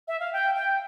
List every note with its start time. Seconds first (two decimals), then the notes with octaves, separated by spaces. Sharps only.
0.08 E5
0.20 F5
0.33 G5
0.55 G5